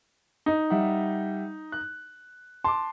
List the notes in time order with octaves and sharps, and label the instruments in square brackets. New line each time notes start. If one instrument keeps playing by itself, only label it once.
[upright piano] D#4
[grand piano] G3 E5 F#5
F#6
[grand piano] A5 D6 [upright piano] C6